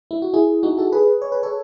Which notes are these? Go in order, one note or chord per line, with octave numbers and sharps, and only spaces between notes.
E4
F#4
E4 G#4
D#4 F#4
F#4 A4
G#4 B4
C#5
B4
A4 C#5